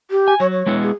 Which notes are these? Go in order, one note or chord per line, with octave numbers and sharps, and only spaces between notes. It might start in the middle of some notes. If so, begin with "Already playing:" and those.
G4
G#5
F#3 C#5
C#5
G#3 B3 E4
G#4